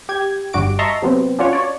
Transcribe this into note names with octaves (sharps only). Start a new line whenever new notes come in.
G4 G#6
G1 G2 G3 F#4 D6 D7
D#5 E5 A5 A#5 C6 C#6
C3 F#3 B3 C4
C#4 D4 F4 F#4 C#5
C#5 D5